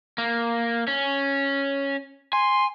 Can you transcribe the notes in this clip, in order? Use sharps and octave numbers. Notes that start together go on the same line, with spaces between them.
A#3
C#4
G#5 C6